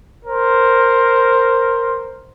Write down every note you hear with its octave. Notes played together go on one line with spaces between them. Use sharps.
A#4 C5